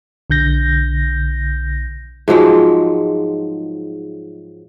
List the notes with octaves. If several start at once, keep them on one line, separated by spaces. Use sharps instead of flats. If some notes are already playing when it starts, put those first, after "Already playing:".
B1 D3 G6 A#6
G#2 F3 F#3 G#3